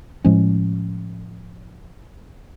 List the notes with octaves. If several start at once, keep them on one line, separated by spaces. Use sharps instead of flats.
A2 F3 G#3 C#4